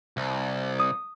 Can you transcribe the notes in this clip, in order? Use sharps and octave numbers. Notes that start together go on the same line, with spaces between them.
C2
D#6